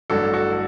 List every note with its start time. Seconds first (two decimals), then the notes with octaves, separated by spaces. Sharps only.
0.10 A1 G2 F#3 F#4 A4
0.33 F#4 A4
0.52 A4